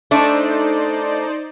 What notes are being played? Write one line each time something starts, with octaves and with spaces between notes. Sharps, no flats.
A3 D4 D#4 C5 D5